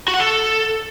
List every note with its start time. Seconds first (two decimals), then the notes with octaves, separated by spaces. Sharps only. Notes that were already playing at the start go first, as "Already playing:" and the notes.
0.08 F#4
0.14 F#5
0.20 A4